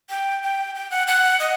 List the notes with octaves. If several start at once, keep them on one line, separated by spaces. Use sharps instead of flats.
G5
G5
G5
F#5
F#5
D#5